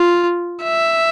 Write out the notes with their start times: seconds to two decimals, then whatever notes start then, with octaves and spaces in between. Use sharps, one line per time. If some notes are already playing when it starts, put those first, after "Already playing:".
Already playing: F4
0.64 E5